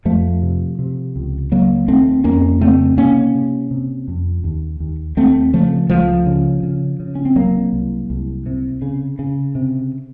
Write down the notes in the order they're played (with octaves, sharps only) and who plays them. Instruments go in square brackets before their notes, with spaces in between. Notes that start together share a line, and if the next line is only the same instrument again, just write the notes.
[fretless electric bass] F2 F3 A3
C3
C3
C#2
C#3 F#3 A#3
D#2 A3 C4
F2 A#3 C#4
C#3 A3 C4
C3 A#3 C#4
C3
C3
F2
D#2
D#2
D#2 A3 C4
C#3 F3 A3
C#2 F3 A3
C#3
C#3
C#3
C#4
C4
C2 F#3 A#3
C2
C2
C3
C#3
C#3
C3